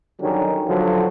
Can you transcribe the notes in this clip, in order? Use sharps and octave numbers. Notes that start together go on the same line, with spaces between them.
D3 D#3 F#3 G3 C#4 D#4
G2 D3 F3 F#3